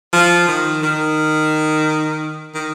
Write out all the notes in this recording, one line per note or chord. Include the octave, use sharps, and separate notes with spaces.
F3
D#3
D#3
D#3